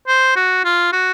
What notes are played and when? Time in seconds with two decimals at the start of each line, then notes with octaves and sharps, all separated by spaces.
0.08 C5
0.36 F#4
0.65 F4
0.93 F#4